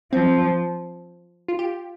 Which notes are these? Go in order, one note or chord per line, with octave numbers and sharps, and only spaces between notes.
F3 C4
F4
G4